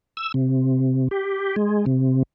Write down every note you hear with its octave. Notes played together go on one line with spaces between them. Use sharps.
E6
C3
G4
G#3
C3